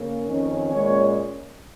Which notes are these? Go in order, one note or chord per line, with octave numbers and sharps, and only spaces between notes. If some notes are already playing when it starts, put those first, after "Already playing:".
Already playing: C#3 A#3
F2 D#3 C#4
A#2 G#3 C#4 C#5